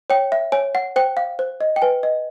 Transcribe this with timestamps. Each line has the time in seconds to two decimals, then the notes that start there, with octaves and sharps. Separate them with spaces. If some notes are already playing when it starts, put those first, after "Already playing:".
0.10 C#5 G5
0.32 E5
0.52 C#5 G#5
0.75 F#5
0.96 C5 G5
1.17 F5
1.39 C5
1.61 D#5
1.76 G5
1.82 B4 G#5
2.03 D#5